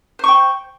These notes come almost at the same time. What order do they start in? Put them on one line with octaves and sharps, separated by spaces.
C5 C#6 G5